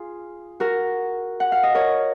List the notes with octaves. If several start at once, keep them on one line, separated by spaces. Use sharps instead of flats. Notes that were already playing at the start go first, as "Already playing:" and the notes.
Already playing: F4 G#4
F#4 A#4
F#5
F5
D#5
A#4 C#5